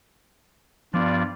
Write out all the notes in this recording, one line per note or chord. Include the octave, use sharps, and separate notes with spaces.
G2 F3 B3 F4 D5